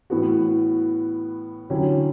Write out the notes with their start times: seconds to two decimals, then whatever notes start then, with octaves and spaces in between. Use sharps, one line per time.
0.10 A2 E3 B3 F#4
1.70 D3 F#3 C#4 E4 G4